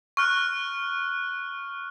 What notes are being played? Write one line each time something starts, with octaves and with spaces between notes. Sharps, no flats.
C#6 F6 F#6